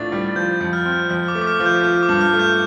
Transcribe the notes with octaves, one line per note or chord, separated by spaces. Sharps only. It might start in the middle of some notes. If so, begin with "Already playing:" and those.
Already playing: A2 F3 D4 A6
G3
F3 G6
F2
F6
C4
F2 F6
D6
A3
D6
F6
F3
G6
F3 F6
D6
G2
F6
A3
G6